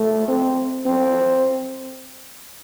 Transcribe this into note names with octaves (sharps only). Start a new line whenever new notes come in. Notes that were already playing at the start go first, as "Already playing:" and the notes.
Already playing: A3
C4
C4